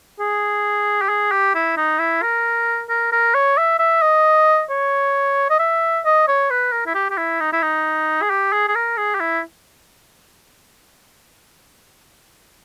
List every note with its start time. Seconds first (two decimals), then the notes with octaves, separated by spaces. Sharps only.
0.19 G#4
1.01 G4
1.09 G#4
1.31 G4
1.54 E4
1.77 D#4
1.99 E4
2.22 A#4
2.89 A#4
3.12 A#4
3.34 C#5
3.58 E5
3.79 E5
4.02 D#5
4.70 C#5
5.50 D#5
5.59 E5
6.05 D#5
6.28 C#5
6.50 B4
6.72 A#4
6.86 E4
6.94 G4
7.10 G4
7.17 E4
7.40 D#4
7.52 E4
7.62 D#4
8.22 G#4
8.30 G4
8.52 G#4
8.68 G#4
8.75 A#4
8.97 G#4
9.14 G4
9.20 E4